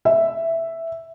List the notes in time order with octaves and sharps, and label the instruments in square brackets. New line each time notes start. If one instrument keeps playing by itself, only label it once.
[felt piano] E5